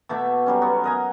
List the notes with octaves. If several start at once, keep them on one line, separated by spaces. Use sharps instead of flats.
B2 A3 E5 D6
F#3 G3 C#4
B3 F#4
A#4 D#5 G#5